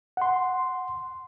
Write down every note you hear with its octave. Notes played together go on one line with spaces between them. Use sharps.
F#5 C6